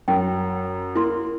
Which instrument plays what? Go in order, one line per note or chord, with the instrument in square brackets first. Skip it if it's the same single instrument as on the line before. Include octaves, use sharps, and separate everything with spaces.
[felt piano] F#2 [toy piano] G5
[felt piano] A#3 [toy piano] E4 C6